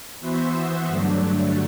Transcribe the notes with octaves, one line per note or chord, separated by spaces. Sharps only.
E3 B3 F#4 C5 E5
G2 D3 F#3 A3 D4